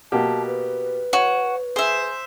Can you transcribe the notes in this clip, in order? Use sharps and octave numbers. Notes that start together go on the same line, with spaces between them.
B2 A#3 G4 A5
B4
F#4 C#5
G#4 C5 E5